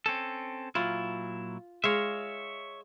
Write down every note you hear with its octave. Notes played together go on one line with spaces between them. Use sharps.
C4 C#4 A4
A#2 F#3 E4 F4
G#3 C#5 E5 F5